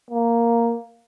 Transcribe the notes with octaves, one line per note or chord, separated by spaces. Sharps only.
A#3